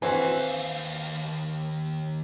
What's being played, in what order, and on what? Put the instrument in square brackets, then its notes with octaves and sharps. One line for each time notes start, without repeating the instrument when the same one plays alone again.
[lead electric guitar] D#2 F5 [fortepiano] E3 C4 F#4